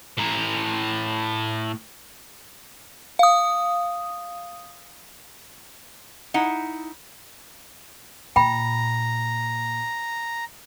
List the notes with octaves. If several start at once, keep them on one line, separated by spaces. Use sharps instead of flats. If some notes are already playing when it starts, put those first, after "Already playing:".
A2 A#5
F5 D#6
D#4 E4 F#5
A#2 G5 A#5 B5